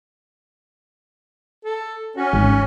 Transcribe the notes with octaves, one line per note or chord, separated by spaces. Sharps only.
A4
C#4 F#4
G#1